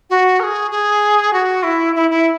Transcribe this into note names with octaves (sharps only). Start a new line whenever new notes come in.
F#4
A#4
G#4
G#4
F#4
E4
E4
E4